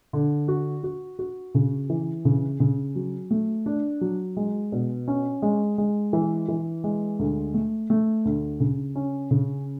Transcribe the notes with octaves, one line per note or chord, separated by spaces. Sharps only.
D3
F#4
F#4
F#4
C#3
E3
C#3
C#3
F#3
A3
D4
F#3
G#3
B2
C#4
G#3
G#3
E3
E3
G#3
D2
A3
A3
D2
C#3
C#4
C#3